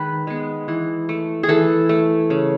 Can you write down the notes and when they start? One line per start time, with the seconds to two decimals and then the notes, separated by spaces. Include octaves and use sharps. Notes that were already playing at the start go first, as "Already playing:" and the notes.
Already playing: D#3 G#3 B4
0.27 G#3 B3
0.68 E3
1.09 A3
1.43 G#4
1.48 E3 A4
1.89 A3
2.30 C#3